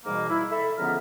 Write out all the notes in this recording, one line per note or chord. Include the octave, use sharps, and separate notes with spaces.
G#2 B2 E3 G3 A#3
E4
A4 E5 B5
C#2 D3 F3 B3 A#5 F6